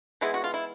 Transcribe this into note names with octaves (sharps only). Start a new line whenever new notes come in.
E3 G#3 B3 E4
F#4
F4
E4